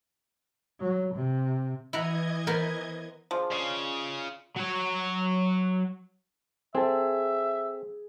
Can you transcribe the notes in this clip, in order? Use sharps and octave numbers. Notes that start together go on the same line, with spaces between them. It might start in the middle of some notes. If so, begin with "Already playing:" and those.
F#3
C3
E3 E4 D#5 F#5 A#5 G#6
B3 A#4 C5
F3 D4 F4 G#4
C#3 D#5 C#6
F#3 C#5
C4 G#4 A4 E5